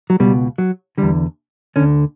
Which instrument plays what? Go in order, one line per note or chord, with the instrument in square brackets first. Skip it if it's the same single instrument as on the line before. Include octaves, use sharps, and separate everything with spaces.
[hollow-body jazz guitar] F#3
C#2 B2 G3
F#3
E2 D3 G3
D2 D3 C#4